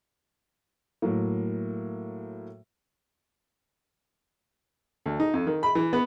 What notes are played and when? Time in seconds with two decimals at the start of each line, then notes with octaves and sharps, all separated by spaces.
1.02 A2 F#3 A#3
5.06 D2
5.20 D#4
5.34 F2
5.47 D#3
5.63 B5
5.75 E3
5.93 B3